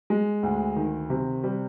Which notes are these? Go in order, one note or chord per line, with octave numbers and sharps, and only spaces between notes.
G#3
D2
D#3
C3
G3